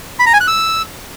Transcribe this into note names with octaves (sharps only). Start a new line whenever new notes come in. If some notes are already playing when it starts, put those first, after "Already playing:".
B5
A#5
G#5
F#6
E6